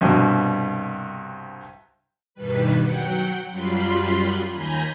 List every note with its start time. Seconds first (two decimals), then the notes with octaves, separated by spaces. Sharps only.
0.01 C2 G2 B2
2.34 E2 G2 B2 D#3 G3 B4
2.80 F#3 F#5 G5
3.50 F#2 F#3 G3 F4 B5 C6
4.51 D#2 G#5 A#5 B5 G6